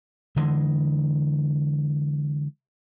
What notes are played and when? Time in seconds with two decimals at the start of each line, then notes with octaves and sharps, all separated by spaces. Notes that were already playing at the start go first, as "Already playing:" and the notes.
0.36 D3 E3 G#3